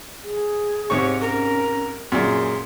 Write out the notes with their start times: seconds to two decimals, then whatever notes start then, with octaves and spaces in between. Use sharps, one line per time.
0.23 G#4
0.90 G#2 C3 C#5 C#6
1.20 C#4 A#4
2.12 F#2 A#2 G#4 C6